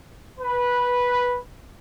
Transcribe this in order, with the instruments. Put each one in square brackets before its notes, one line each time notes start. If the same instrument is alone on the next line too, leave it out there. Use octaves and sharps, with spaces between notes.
[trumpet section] B4